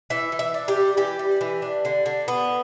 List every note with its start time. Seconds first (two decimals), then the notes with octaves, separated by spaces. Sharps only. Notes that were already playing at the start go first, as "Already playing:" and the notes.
0.10 E3 E5
0.32 E3
0.39 E5
0.54 D4
0.68 G4
0.76 G3
0.97 E3 G4
1.19 G3
1.41 E3
1.62 D4
1.85 D3
2.06 D3
2.28 B3